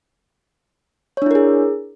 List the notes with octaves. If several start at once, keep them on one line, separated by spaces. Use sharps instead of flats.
D4 E4 G#4 A#4 C#5